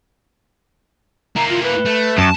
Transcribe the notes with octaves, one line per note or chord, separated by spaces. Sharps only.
A#3 E4 A#5
F4
B4
A3
F#2 A5